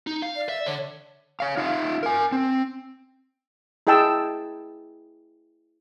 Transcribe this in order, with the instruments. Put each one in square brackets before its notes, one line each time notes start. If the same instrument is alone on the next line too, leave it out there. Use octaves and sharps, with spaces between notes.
[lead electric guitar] D#4
F5
[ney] D5
[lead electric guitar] E5
[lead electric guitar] D3 [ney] C#5
[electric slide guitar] C#5 F5
D#4 F4 E5 F5
A#4 G#5
C4
[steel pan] E4 G#4 D#5 G5 A5 E6